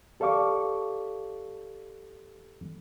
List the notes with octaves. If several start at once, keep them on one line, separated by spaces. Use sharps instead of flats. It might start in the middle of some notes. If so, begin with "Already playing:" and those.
G4 A4 D5 F5 C#6 D6